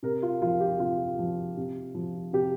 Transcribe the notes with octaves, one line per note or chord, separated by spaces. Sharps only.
C3 A#4
F4
F3 F4
G4
C3 F4
F3
C3
F3
C3 G4